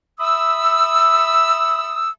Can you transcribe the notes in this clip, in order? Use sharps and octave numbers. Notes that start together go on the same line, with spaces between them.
E5 B5 D#6 E6